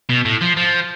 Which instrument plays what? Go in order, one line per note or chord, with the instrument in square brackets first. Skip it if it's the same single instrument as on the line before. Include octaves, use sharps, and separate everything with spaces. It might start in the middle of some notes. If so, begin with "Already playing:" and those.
[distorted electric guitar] B2
A2
F3
F3